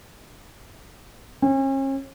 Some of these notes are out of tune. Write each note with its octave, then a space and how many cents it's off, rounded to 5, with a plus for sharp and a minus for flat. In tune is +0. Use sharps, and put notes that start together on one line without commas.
C#4 -40